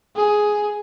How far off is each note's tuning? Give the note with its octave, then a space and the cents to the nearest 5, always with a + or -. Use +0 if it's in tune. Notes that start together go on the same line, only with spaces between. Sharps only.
G#4 +5